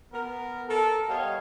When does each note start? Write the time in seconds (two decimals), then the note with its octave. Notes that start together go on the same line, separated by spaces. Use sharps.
0.12 B3 A#4
0.69 A4 A#4
1.08 G3 B3 C#5 D#5 F5